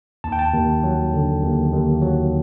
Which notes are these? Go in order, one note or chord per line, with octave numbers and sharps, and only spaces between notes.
D#2 A5
G5
A5
D#2
F#3
D3
D#2
D#2
F#3